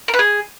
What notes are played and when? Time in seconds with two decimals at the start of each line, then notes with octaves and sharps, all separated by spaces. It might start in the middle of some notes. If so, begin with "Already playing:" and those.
0.08 A#4
0.14 B4
0.19 G#4